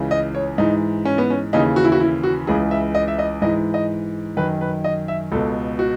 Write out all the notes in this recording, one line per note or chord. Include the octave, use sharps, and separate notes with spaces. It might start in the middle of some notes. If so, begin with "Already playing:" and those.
Already playing: C#2 C#3 E3
D#5
C#5
G#2 E3 D#4
C#4
B3
C#4
D#2 C#3 E3 D#4
F#4
E4
F#4
E4
F#4
C#2 C#3 E3 G#4
E5
D#5
E5
D#5
G#2 E3 D#5
D#5
F#2 D#3 B4
B4
D#5
E5
C#2 B2 A4
F#4